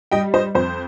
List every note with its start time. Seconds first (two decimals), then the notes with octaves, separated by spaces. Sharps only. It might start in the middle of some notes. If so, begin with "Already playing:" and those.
0.12 G3 D#5 G5
0.34 C5 D#5
0.55 F2 C5